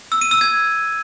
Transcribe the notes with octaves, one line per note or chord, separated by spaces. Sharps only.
E6
D#7
E6
G#6